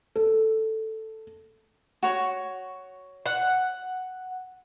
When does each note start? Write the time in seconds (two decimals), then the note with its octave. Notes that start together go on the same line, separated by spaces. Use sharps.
0.15 A4
2.03 F#4 C#5
3.26 F#5